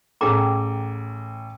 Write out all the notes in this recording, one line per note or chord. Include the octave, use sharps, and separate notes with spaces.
A1 G#4 A4 G5 A#5 D6